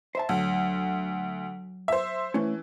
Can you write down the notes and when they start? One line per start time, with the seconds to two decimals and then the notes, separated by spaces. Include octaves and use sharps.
0.15 C5 E5 A5
0.29 D2 F#3
1.88 C5 E5
2.34 E3 A3 C#4